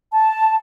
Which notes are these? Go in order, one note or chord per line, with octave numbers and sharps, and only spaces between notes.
A5